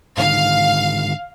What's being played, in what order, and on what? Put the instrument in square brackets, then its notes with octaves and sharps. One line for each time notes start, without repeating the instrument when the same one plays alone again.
[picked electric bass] G#2 D3 D#3 [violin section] F5